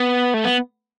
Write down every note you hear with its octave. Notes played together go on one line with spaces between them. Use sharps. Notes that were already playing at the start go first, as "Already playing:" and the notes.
Already playing: B3
A3
B3